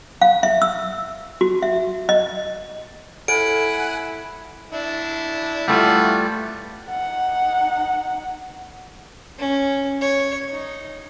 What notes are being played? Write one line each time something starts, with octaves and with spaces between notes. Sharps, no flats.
F5
E5
E6
F#4
E5
D#5
E4 A4 F#5 G#5 F#6 D7
D4 E4
E3 G3 A3 F4 F#5
D#4 F#5
C#4
C#5
D#4